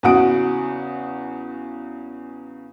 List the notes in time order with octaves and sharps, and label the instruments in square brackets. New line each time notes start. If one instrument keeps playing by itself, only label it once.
[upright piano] E2 C#3 F#4 F#5 D#6 D7